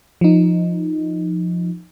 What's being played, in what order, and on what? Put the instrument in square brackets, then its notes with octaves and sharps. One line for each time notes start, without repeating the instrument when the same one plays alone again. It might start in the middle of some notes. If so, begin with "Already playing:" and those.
[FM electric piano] F3 D#4